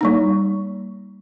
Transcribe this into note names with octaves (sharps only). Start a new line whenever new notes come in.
G3 A#3 D#4